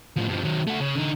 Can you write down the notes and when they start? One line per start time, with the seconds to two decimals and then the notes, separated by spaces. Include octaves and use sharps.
0.16 A2 F3
0.29 G2 F3
0.44 D#3 F#3
0.67 A3 F#4
0.80 C#3
0.95 D3 D#4